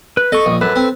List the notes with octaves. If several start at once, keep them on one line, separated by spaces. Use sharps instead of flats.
B4
A4 D#5 C#6
A#1
F#2 A4 B4
C4